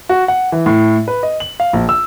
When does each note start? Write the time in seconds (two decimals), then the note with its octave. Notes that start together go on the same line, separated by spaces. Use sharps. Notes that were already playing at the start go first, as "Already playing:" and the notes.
0.09 F#4
0.28 F#5
0.52 E3
0.66 A2
1.08 B4
1.23 D#5
1.40 F#7
1.60 F5
1.73 A#1
1.89 E6